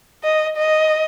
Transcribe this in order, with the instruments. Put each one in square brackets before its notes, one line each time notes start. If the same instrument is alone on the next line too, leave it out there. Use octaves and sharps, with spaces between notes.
[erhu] D#5
D#5